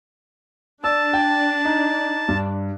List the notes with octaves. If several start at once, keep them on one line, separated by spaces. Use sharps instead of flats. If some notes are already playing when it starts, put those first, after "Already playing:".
D4 D5 A5 E6
G5
D#4
G2